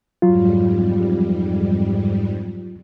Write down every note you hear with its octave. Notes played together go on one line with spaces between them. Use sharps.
F2 G#2 F#3 G3 F4